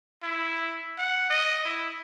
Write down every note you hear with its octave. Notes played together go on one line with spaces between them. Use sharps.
E4
F#5
D#5
E4